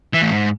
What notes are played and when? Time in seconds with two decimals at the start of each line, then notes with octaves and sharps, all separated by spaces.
0.14 E3
0.22 A2
0.31 G#2